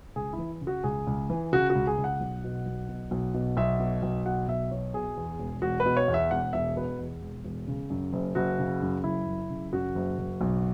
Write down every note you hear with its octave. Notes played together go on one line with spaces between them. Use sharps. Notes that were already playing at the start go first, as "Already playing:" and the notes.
C#2 G#4
E4
E3
C#3
F#4
C#2 G#4
C#2
E3
C#3 F#4
F#4
C#2
G#4
C#2
F#5
B1
B2
B1
B2
B1
B2
B1 E5
B2
B1
B2 F#5
B1 E5
B2 C#5
B2 G#4
E2
E1
E1 F#4
B4
B2
C#5
E2
E5
E1 F#5
E1 E5
B2 B4
E2
E1
E1
C#3
F#2
F#1
F#1 F#4
C#3
F#2
F#1 E4
F#1
C#3
F#2 F#4
F#1
F#1
B1